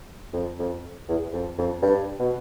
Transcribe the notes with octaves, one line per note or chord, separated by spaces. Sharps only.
F2
F2
E2
F2
F2
G2
B2